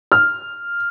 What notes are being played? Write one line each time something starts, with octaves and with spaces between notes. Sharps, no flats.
F6